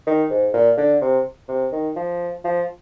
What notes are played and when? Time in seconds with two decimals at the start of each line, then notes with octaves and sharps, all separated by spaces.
0.07 D#3
0.30 G#2
0.54 A#2
0.77 D3
1.02 C3
1.49 C3
1.72 D#3
1.96 F3
2.45 F3